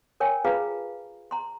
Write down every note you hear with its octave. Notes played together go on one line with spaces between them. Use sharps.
A#4 C#5 G5 G#5
F4 G#4 B4 F5 A#5 B5
A#5 C6